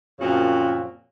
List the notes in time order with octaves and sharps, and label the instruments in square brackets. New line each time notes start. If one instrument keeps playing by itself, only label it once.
[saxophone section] F#2 A#2 C#3 F3 C4 F#4